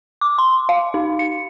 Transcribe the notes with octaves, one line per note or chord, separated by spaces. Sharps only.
D6
C6
F5
D#4
C#7